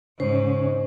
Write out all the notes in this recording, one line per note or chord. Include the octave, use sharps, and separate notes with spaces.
G#2 C#3 C#4 C5